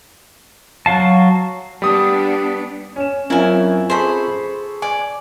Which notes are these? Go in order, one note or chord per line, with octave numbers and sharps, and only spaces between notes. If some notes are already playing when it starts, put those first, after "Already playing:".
F#3 F5 A5
G3 B3 D4 D#6
C#4 E7
F#2 C4 C#4 E4 F4 A#4 C#5 G#5
G#4 A4 C5 B5 C#6
D5 G#5